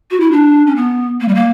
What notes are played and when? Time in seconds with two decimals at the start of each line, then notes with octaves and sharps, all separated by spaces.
0.11 F#4
0.20 E4
0.32 D4
0.67 C#4
0.76 B3
1.21 A#3
1.28 G3
1.35 A#3